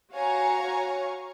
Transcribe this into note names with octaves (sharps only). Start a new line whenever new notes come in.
F#4 C#5 F5 G#5 A#5 C#6